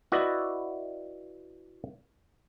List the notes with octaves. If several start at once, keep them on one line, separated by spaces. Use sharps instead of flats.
E4 F#4 B4 D5 D#5